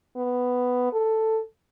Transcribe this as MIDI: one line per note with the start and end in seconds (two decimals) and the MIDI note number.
0.17 0.92 59
0.93 1.40 69